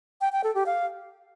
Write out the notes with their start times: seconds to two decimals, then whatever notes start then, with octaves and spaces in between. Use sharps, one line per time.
0.21 G5
0.32 G5
0.44 A4
0.55 G4
0.66 F5